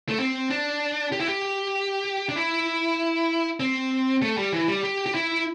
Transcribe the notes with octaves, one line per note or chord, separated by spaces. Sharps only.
A3
C4
D4
G4
E4
G4
D4
E4
C4
A3
G3
E3
G3
G4
G4
E4